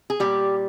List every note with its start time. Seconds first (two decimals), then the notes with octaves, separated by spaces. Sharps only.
0.10 G#4
0.20 A#2 G3 G4